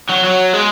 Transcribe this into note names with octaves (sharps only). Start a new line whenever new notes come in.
F#3
F#3
G#3